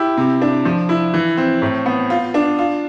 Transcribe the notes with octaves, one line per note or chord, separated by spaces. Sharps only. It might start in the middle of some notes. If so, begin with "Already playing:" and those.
Already playing: E4 G4
C3
D4
F3
E4
E3
C4
A2
B3
F4
D4
F4